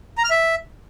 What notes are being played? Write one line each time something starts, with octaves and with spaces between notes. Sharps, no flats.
A#5
F6
E5